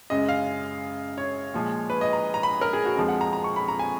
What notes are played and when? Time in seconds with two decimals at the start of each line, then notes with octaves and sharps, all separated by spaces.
0.10 F#2 C#3 G#3 D#5
0.29 F5
1.18 C#5
1.54 A#2 F3 G#3
1.90 B4
2.01 D#5
2.13 A#5
2.34 A#5
2.43 B5
2.61 A#4
2.73 G#4
2.85 F#4
2.96 F2 F3 G#3
3.08 F#5
3.21 A#5
3.33 A#5
3.44 C#6
3.56 B5
3.68 A#5
3.79 G#5